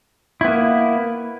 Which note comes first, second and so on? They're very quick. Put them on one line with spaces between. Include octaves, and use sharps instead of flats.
E4 B3 A#3